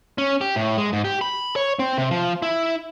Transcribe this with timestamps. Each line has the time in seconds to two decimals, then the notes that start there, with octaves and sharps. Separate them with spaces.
0.18 C#4
0.41 G4
0.56 A2
0.78 G#3
0.93 G#2
1.05 G4
1.21 B5
1.56 C#5
1.79 C4
1.98 C3
2.11 F3
2.42 E4